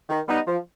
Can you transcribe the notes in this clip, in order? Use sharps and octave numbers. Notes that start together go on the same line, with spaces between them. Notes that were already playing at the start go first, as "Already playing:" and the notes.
D#3
G3 B3 D#4
F3